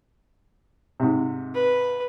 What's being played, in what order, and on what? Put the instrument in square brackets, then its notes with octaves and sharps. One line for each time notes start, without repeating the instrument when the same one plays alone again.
[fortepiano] G#2 C3
[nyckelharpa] B4